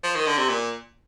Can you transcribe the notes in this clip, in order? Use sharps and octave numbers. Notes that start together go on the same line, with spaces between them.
F3
D#3
D3
C3
A#2